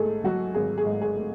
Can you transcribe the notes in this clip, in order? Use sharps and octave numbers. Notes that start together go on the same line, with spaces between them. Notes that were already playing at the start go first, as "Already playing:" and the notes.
Already playing: G#2 A3 G#4 A4
F#3 F#4
G#1 G#4
G#4
G#2
G#4
A3